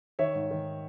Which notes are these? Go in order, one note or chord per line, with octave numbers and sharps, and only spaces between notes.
D#3 C#5 E5
G#2
D#3